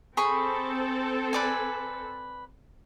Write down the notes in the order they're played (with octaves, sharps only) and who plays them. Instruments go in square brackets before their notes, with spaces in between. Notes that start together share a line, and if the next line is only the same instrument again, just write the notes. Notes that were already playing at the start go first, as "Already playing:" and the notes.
[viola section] C4 A4 [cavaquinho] G#4 B5 C#6
[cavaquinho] B4 D5 G#5